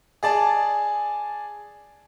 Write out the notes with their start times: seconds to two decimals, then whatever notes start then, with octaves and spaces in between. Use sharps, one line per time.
0.23 G#4 D5 A5